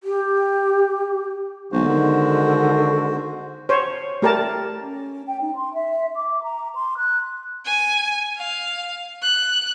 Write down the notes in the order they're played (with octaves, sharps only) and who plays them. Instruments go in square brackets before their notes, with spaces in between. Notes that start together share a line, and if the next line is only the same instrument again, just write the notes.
[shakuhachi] G4
[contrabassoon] B1 [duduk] D3 [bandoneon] G#3 F#4 C5
[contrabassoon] D#3
[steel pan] C5 C#5
A3 G4 A#4 D5 A5
[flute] C#4
G5
D#4
C6
E5
D6
A#5
C6
F#6
[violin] G#5
F5
F#6